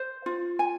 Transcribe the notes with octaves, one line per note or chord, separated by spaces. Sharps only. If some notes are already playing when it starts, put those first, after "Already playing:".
Already playing: C5
F4
G#5